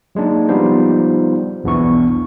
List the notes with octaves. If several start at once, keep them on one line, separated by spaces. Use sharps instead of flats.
F#3 G#3 A#3 D4 D#4
F3 G3 B3 D#4 F4 C5
B1 E2 B3 D4 E4 C#6